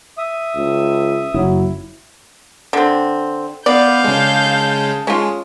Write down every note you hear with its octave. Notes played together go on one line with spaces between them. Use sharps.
E5 D#6
C#2
F#1 F#3 E4
D3 C4
B3 D5 F5 B5 G6
C#3 G#3 A5
G#3 C#4 F4